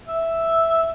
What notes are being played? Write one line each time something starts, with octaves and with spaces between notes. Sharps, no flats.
E5